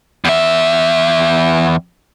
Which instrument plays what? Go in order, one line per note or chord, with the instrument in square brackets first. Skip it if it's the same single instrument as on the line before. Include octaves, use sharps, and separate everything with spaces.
[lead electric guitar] E2 E5